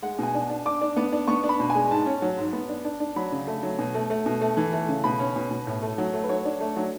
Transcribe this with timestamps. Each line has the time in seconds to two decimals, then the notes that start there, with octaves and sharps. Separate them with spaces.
0.02 G#3 F#5
0.19 B2 G#5
0.34 D4
0.50 D4
0.65 D4 D6
0.81 D4
0.97 B3
1.13 D4
1.28 B3 C#6
1.44 D4
1.49 B5
1.60 B2
1.70 G#5
1.75 G#3
1.91 G#2 A5
2.06 C#4
2.22 F#3
2.38 G#2
2.53 B3
2.69 D4
2.85 D4
3.00 D4
3.16 F#3 B5
3.32 C#3
3.47 A3
3.63 F#3
3.79 B2
3.95 A3
4.10 A3
4.26 B2
4.41 A3
4.57 E3
4.73 A3
4.89 C#3
5.04 B2 B5
5.19 C#4
5.36 B2
5.51 B2
5.67 A2
5.82 A3
5.98 F#3
6.14 A3
6.24 B4
6.29 F#3 C#5
6.45 D4
6.60 A3
6.77 F#3